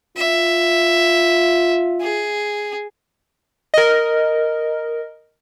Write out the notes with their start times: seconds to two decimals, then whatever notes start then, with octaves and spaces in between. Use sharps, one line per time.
0.17 F4 E5
2.01 G#4
3.74 A#4 D#5